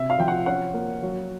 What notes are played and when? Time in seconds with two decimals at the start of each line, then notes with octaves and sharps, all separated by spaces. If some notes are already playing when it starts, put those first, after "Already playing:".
Already playing: C3 E5
0.10 F5
0.19 F3 G5
0.28 F#5
0.46 C#4 F#5
0.74 A#3
1.02 F#3